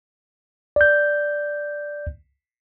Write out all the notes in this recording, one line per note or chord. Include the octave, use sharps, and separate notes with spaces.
D5 G6